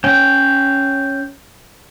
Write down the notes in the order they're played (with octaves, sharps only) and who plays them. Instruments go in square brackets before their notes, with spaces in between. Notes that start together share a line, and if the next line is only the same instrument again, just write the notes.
[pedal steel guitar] C#4 G5